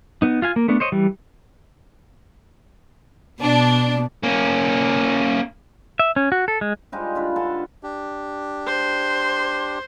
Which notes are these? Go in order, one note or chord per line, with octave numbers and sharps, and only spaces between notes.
B3 D#4
F4 F5 G#5
A#3
A3 B3 D4
C5 C#5 D#5
E3 G3
B2 D4
A#3 C#4
E5
C#4
F#4
A4
G#3
G3 G#3 D#4 F4
D3 F4 B4
D3 A4 F5 G#5
D4 G4
C5